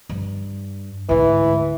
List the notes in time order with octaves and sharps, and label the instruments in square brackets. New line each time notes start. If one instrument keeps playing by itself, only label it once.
[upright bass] G2
[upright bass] D2 G#2 [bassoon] E3